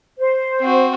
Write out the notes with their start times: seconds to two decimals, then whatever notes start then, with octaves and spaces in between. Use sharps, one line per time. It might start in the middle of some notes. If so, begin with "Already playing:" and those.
0.18 C5
0.60 C4 F#4